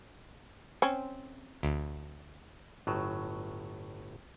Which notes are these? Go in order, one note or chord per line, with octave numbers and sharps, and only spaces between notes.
C4 C#4 C#6
D2
G1 A2 F#3